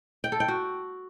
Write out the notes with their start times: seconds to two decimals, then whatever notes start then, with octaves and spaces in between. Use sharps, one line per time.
0.24 G5
0.32 A4
0.40 G5
0.48 F#4